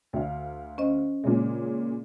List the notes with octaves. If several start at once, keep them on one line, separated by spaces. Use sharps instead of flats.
D2 F5
C#4 C5 D#5
A#2 C#3 G#3